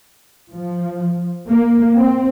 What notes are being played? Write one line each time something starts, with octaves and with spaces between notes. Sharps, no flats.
F3
A#3
C4